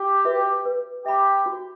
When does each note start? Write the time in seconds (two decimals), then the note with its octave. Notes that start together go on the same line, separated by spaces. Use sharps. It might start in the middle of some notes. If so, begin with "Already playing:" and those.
Already playing: G4
0.25 F#4 B4 E5
0.65 B4
1.06 G4 E5 B5
1.46 F#4